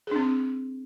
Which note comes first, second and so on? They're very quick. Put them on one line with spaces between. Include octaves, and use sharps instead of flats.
G#4 D4 C4